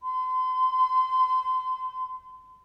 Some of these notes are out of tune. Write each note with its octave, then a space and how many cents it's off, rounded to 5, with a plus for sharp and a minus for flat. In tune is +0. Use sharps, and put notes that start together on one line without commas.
C6 -35